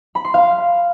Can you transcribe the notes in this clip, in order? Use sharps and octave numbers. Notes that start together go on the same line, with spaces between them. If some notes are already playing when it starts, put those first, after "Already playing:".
B5
C6
F5